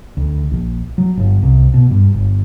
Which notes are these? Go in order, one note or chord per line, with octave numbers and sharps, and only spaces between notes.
D2
A#1
F#3
G1
C2
B2
G2
G1